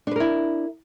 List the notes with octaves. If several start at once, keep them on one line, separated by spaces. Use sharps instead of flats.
D4 E4 A#4 B4